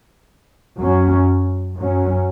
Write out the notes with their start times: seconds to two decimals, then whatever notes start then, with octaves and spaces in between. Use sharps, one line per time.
0.79 F#2 F#3 C#4
1.76 F#2 F#3 C#4